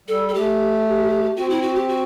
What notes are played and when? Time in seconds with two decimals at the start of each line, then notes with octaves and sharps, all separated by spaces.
0.08 G3 A4
0.28 A4
0.35 A3 G4
1.37 C4 F#4
1.50 E4
1.62 F#4
1.76 G4
1.88 F#4